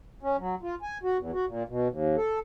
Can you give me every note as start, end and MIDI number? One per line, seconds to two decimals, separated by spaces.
0.23 0.37 61
0.39 0.55 54
0.63 0.75 65
0.82 0.98 80
1.03 1.17 66
1.18 1.31 40
1.33 1.45 66
1.47 1.63 46
1.68 1.88 47
1.88 2.16 39
2.16 2.39 69